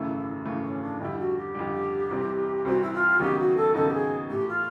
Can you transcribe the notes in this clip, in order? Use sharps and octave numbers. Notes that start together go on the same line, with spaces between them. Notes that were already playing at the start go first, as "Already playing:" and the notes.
Already playing: G#1 F#2 C#3 E3 A3 E4
G#1 F#2 C#3 E3 A3
C#4
D4
F2 D3 G3 E4
F#4
G4
F2 D3 G3
C2 C3 E3 G3 C4
C2 C3 E3 G3 C4 F#4
E4
F4
D#2 C#3 F#3 B3 D#4 G4
F#4
A4
D#2 C#3 F#3 B3 D#4 A4
G4
G#4
A2 E3 A3 G4
F4